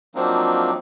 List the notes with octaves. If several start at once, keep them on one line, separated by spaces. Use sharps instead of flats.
F3 F#3 A#3 C4 D4 D#4